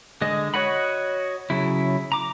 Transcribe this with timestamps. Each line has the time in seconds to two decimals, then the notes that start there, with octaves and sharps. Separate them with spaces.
0.21 D3 G#3 D#5
0.54 F#4 C#5 D#5 F#5 B5
1.50 C#3 F#3 E4
2.12 A#5 D6